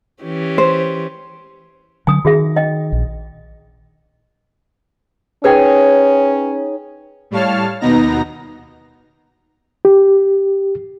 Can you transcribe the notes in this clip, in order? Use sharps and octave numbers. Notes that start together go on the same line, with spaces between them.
E3 C#4 G4
C5
D3 F#3 G#5 D#6
D#3 F#4 G#4 E5
D#5 G5
A#1
C#4 D#4 G#4 B4 C#5 G5
A2 G3 C#5 F5 A5 F6
D#2 B2 B3 D#4 A#5 A#6
G4